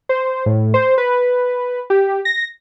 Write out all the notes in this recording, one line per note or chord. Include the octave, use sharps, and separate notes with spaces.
C5
A2
C5
B4
G4
A#6